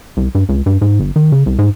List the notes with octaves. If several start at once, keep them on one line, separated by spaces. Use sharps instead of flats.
C2
G2
C#2
G2
G#2
G1
D#3
C#3
C2
G#2